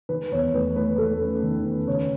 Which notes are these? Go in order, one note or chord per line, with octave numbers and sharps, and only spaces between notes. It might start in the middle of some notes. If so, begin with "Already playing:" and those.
D#3 B4
E2 C#5
A3 B4
A3 B4
A3 A4
C#4
D#3
C#4
C#3 C#5